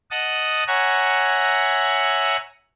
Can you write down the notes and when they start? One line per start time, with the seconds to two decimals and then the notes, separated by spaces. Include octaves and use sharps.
0.11 D#5 F#5 A5 D#6
0.67 C#5 E5 F#5 G#5 A#5